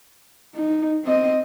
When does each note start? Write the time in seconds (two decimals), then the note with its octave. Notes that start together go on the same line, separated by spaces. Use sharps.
0.55 D#4
1.04 C4 D#5